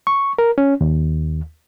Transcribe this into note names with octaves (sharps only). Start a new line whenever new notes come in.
C#6
A#4
C#4
D#2